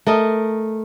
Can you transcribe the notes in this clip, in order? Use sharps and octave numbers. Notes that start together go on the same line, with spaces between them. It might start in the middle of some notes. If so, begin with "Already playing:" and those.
A3 A#4 D#5